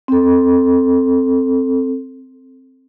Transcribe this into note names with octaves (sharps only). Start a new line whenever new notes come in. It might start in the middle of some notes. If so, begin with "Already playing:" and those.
C4 A4